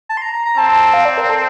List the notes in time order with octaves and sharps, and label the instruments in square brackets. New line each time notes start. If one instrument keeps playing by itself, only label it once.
[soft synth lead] A5
C6
A#5
A#5
A#5
[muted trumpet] C4 [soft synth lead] A5
[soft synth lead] F5
D5
A#4
A4